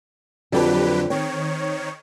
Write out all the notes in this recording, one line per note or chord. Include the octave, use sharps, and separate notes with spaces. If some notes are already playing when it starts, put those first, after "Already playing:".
F2 D3 F#3 G4 B4
D#3 C4 C#5